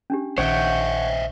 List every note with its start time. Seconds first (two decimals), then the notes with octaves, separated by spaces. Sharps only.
0.10 C#4 D4 G4
0.38 A#1 D#3 C5 C#5 D#5 E5 F#5 G5